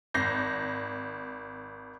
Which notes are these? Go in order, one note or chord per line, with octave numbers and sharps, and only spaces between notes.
G#1 G6 A#6 C7